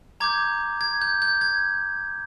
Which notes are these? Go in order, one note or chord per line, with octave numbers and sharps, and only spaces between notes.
A#5 D6 G6 G#6
G#6
G6
G6
G#6